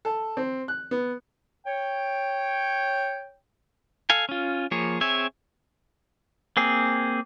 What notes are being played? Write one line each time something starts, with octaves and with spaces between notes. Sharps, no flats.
A4
C4
F#6
B3
C#5 G5
A4 F5 G#5
C#4 F4
F3 A#3 G#4 C#5
C4 G#4 C#5 E5 G#5
A#3 C4 G#4